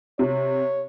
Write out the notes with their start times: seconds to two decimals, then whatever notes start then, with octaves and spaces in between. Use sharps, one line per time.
0.19 C3 C#5